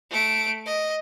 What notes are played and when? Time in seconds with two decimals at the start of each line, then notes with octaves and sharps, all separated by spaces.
0.10 A3 D7
0.66 D#5